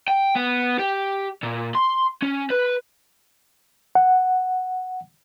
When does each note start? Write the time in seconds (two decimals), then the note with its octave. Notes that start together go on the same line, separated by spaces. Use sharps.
0.08 G5
0.36 B3
0.79 G4
1.43 A#2
1.75 C6
2.23 C#4
2.50 B4
3.95 F#5